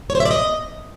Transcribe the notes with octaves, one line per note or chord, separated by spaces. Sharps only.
C#5
C5
E5
D5
D#5